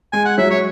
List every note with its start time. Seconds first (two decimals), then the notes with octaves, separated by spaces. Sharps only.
0.13 G#3 G#5
0.25 F#5
0.38 F#3 E5
0.50 C#5